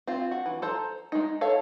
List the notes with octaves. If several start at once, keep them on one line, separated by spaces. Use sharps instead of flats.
C4 F4
F#4
E3
A4 C5 A#5
G#3 D#4
A4 C#5 F5